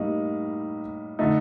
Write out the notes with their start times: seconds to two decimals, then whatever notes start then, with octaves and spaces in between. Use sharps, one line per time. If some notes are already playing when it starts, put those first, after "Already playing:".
Already playing: A2 G3 A#3 D#4
1.19 D3 A3 D#4